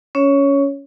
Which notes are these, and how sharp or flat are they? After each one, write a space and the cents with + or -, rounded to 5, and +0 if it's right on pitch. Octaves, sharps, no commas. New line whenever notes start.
C#4 +15 C#5 +0